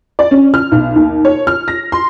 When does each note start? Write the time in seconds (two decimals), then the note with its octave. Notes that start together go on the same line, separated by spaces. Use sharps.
0.19 D5
0.31 C#4
0.54 F6
0.72 B1
0.96 D#2
1.25 C#5
1.47 F6
1.68 A#6
1.92 C6